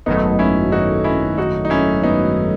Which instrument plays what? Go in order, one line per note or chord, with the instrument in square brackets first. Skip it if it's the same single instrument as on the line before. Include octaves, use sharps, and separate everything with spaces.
[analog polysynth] G#1 F#2 D#3 F#3 A3 [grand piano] B3 D#4
[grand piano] C#4 E4
D#4 F#4
C#4 E4
D#4 F#4
D#4
C#4 E4
B3 D#4